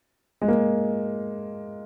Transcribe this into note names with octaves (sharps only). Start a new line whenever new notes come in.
G#3
A#3